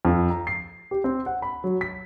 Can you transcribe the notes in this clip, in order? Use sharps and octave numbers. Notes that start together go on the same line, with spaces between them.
F2
A#5
C7
G4
C4
F#5
B5
F#3
B6